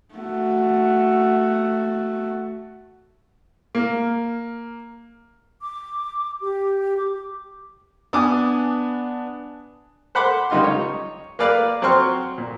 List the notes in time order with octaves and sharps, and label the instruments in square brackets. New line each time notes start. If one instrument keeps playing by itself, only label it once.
[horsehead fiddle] A3 F#4
[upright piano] A#3
[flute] D6
G4
D6
[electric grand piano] B3 D4 [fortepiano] G#5 D6 D#6
[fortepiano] C5 F#5 B5 C6 D6
C#2 G3 D#4 F4 C6
D#4 C#5
A#3 A#4 B4 D5 F5
F#3 C4 G5 C6 C#6 F6
A#2